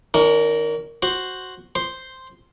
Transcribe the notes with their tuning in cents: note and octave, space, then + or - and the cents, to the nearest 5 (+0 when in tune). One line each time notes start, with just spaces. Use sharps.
D#3 -5 C#4 +45 A#4 +0
F#4 +0 C5 +0
C5 -5 C6 +0